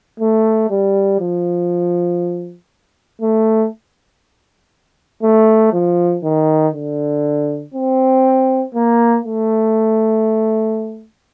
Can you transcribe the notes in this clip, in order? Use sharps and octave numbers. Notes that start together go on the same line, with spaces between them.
A3
G3
F3
A3
A3
F3
D#3
D3
C4
A#3
A3